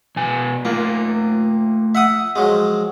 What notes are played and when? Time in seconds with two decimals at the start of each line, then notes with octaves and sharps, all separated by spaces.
0.16 B2 G#5
0.65 A3 A#3 F4
1.95 E5 F#5 D#6
2.36 F3 F#3 G#3